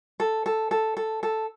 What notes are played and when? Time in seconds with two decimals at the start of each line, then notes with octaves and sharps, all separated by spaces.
0.20 A4
0.46 A4
0.71 A4
0.97 A4
1.23 A4